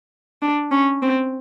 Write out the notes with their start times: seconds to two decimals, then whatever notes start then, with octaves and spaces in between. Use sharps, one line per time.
0.42 D4
0.72 C#4
1.02 C4